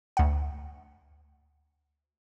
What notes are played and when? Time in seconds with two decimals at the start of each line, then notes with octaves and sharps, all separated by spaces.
0.17 D2 F#5